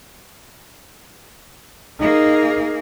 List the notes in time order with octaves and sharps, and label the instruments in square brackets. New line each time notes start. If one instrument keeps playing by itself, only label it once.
[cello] A#3 G#4 [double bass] D#4